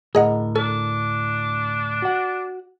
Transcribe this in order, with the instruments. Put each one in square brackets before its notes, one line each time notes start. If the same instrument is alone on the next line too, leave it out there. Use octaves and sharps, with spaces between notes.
[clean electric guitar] D2 A2 A#4 [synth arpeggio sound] G#4 D#5 F#5
[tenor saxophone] D4 [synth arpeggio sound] A4
[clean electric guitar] F#4 F#5